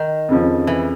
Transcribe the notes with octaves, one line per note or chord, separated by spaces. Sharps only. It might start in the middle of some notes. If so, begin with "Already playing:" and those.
Already playing: D#3
F2 C#3 F3
E3